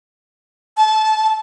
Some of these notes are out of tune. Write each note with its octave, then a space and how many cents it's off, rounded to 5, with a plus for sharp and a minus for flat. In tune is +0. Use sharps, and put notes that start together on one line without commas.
A5 -25